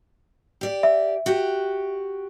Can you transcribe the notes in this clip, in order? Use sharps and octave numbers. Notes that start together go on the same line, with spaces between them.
G4 D5
E5
F#4 G4